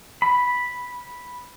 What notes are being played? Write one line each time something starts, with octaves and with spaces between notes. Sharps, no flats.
B5